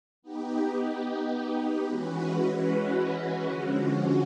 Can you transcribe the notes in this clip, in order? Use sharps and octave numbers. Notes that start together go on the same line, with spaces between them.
B3 D#4 G4
E3 G#3 C#4 F#4 B4
D3 F3 G#3 C#4 F#4